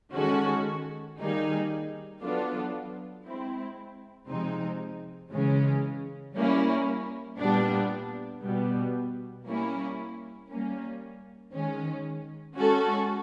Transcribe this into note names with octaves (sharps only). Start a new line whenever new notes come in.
D#3 G#3 C#4 F#4 A4
D#3 G3 A#3 D#4 G#4
F#3 B3 D4 F4 A4
G#3 C4 E4
C3 F3 G#3 C4 D#4
C#3 E3 G#3 C#4
G3 A#3 C#4 E4
A#2 G3 B3 D4
B2 G3 B3
G3 A#3 C#4 E4
G3 A#3 C#4
D#3 G#3 C#4
G#3 C#4 F#4 A4